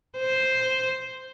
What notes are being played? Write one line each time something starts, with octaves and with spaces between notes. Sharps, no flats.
C5